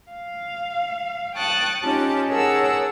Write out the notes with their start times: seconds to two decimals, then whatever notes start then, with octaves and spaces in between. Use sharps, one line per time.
0.12 F5
1.36 G5 A5 C#6 D#6 F#6 A6
1.83 C#4 D#4 F4 G4 A5
2.28 G#4 A#4 C#5 F#5 A5 E6